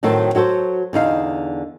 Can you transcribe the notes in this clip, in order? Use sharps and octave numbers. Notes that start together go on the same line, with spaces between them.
A2 D#3 F#3 C4 A4
F#3 F#4 A4 C5
E2 D3 D#4 F5